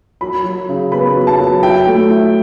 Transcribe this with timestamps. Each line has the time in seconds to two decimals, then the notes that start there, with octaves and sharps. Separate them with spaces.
0.21 F#3 B5
0.44 F#3
0.69 C#3
0.92 B3 B5
1.16 F#3
1.27 A5
1.39 F#3
1.63 E4 G5
1.87 A3
2.10 E4